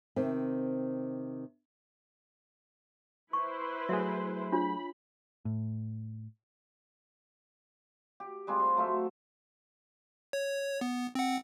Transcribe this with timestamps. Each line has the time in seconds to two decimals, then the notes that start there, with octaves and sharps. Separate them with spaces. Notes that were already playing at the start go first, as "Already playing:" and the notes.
0.16 C3 D#3 C4
3.33 E4 B4 C5 C#6
3.89 F#3 A3 G#4 E5
4.52 D4 F4 C#5 B5
5.45 A2
8.20 G4
8.47 G3 G#3 C4 F4
8.59 C6
8.76 F#3 A3 F4 E5
10.33 C#5
10.81 B3
11.15 C4 F#5